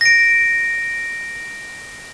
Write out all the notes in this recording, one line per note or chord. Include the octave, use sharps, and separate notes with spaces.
A#6 D7